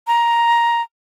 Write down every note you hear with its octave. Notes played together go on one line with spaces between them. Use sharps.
A#5